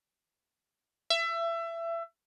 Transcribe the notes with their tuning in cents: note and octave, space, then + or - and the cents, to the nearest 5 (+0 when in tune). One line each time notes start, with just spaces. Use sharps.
E5 +25